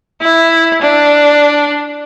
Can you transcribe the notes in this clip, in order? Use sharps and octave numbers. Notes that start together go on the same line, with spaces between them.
E4
D4